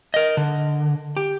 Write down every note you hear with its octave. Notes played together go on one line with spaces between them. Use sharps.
A#4 D#5
D3
G4